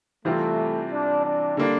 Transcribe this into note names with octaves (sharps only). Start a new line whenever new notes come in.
C3 E3 G3 A3 C4 F4
D4
D4
D3 G3 A#3 D4